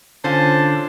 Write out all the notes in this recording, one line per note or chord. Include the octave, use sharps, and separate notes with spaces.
D3 C#4 F4 C5 A5